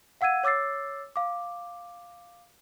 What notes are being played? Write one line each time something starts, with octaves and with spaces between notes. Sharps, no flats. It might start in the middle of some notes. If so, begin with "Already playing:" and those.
F5 F#5 E6 G#6 D#7
C#5 D6 E6 A6 C7
F5 D6